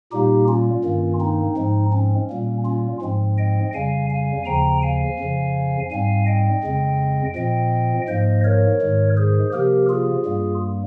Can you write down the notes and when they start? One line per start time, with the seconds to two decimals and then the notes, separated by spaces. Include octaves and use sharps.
0.12 A#2 G3 A#3 D#4 G4
0.48 C#4 F4
0.84 G2 D#3 A#3
1.20 C4 D#4
1.57 G#2 F3 G#3 C4
1.93 C#4
2.30 A#2 G3 A#3
2.65 C#4 F4
3.02 G#2 F3 G#3 C4
3.38 D#5 G5
3.74 F2 C#3 G3 F5 G#5
4.10 F5 G#5
4.46 D#2 C#3 F3 G5 A#5
4.82 F5 G#5
5.19 F2 C#3 F3
5.91 G#2 G3 C4 F5 G#5
6.27 D#5 G5
6.64 F2 C#3 G#3 C4
7.35 A#2 F3 C4 D#5 G5
8.08 G#2 F3 A#3 C5 D#5
8.44 A#4 C#5
8.81 G#2 D#3 G#3
9.17 G#4 C5
9.53 C3 F3 A#3 G4 A#4
9.89 F4 G#4
10.25 G2 G3 A#3